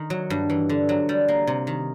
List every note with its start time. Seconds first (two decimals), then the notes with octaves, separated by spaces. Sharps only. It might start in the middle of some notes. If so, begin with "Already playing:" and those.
Already playing: D#3
0.10 F#3
0.30 G2
0.50 E3
0.69 D3
0.89 F#3
1.09 G3
1.28 A#3
1.47 C3
1.67 D#3